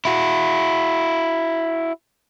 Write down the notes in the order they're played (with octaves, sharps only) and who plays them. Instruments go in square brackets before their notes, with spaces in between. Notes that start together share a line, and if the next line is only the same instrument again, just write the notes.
[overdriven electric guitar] E4 F#4